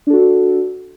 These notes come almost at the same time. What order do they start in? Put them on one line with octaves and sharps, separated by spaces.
D4 A4 F#4